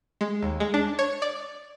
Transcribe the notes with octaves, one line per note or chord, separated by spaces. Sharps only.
G#3
D#2
G#3
D4
C#5
D5